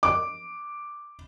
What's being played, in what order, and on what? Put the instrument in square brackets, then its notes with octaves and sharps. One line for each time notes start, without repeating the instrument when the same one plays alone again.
[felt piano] D6